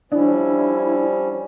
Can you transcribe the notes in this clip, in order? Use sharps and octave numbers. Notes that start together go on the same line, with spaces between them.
F3 G3 C#4 D4 E4